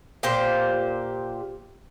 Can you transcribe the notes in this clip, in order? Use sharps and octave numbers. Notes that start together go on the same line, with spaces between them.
A#2 G4 C5